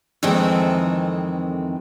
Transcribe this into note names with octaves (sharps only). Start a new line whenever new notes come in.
F2 D#3 E3 G#3 A3 C4